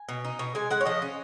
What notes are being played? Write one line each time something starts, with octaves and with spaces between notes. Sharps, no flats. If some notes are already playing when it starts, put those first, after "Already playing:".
Already playing: G#5
B2
D#4
B2
G#3 G#5
G#3 F#5
C#5
F3 D#5
C#4